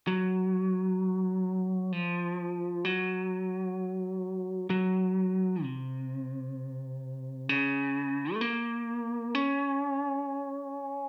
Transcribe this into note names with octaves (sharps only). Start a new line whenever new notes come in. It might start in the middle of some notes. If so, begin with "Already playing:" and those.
F#3
F3
F#3
F#3
C3
C#3
A3
A#3
C#4